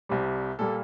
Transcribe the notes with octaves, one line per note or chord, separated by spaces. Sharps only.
C2 C3 G3
A#2 G3 A#3 A4